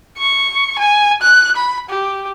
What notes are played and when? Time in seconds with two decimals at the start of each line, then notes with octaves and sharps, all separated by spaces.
0.18 C#6
0.79 G#5
1.22 F#6
1.56 B5
1.89 G4